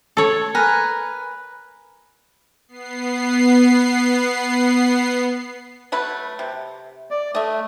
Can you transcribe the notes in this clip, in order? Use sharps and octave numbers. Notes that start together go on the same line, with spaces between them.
A4 C#5
A#4 B4 G#5
B3 C7
F#3 A3 B4
C3
D5
A3 D#5 E5